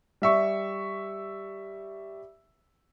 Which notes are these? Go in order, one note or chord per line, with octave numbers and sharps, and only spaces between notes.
G3 E5 C#6